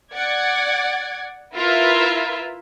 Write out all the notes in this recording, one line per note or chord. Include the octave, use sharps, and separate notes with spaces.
D5 F#5 G#6
E4 F4 A#4 B4 E5